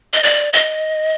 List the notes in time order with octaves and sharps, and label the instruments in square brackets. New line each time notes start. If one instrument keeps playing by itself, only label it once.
[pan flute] D#5
D5
D#5